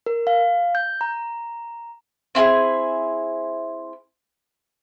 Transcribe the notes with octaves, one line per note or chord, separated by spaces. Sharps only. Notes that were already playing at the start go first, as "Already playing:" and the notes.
A#4
F5
G6
A#5
C4 E4 G4 G#4